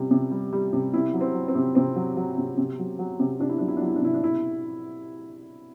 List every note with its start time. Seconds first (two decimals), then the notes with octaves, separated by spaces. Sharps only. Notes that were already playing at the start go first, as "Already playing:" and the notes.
Already playing: C3 G3
0.11 C3
0.31 G3
0.53 G3
0.73 C3
0.94 C3 E4
1.14 F#3
1.21 C4
1.34 F#3
1.48 C4
1.55 C3
1.75 C3 C4
1.96 F#3
2.17 F#3
2.38 C3
2.58 C3
2.79 F#3
2.99 F#3
3.20 C3
3.40 C3 D4
3.49 E4
3.58 F#3 D4
3.68 E4
3.77 D4
3.81 F#3 E4
3.96 D4
4.02 C3 E4
4.14 D4
4.23 B2 E4